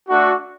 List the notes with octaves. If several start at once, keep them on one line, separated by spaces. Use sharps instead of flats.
A3 D4 F#4